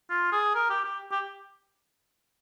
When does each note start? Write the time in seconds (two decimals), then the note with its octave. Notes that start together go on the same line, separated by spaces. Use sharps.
0.10 F4
0.32 G#4
0.55 A#4
0.70 G4
0.85 G4
1.12 G4